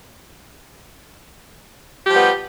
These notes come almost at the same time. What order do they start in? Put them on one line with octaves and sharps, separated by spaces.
G4 F3 G3 B3